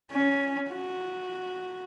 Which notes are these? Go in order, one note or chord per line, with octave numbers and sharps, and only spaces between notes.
C#4
F#4